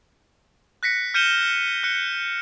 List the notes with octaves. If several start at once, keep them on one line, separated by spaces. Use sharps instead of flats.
F#6 A#6 B6 C#7
F6 G6 C#7 D#7 E7 G7
F#6 C#7